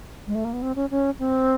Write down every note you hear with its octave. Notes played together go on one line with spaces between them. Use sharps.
G#3
A3
A#3
B3
C4
C#4
C#4
C4